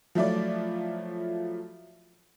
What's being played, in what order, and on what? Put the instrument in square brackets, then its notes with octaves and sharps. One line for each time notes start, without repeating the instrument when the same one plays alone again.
[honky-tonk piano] F3 F#3 A3 E4 F4 D5